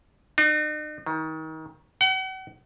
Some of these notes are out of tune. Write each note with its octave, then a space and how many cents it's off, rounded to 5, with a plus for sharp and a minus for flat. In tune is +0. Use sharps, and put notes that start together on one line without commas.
D#4 -45
D#3 +30
F#5 +40